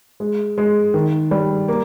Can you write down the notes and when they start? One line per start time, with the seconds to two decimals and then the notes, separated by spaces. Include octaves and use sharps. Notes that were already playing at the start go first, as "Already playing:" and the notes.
0.20 G#3
0.58 G#3
0.94 D#3
1.31 G3
1.68 A#3